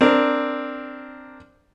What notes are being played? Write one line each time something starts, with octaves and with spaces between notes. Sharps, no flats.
C4 D4 A#4